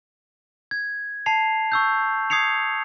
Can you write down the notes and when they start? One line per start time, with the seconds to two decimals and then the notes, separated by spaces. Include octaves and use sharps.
0.71 G#6
1.26 A5 C7 F7
1.72 C#6 E6 G6
2.30 D#6 G#6 C7 C#7 F7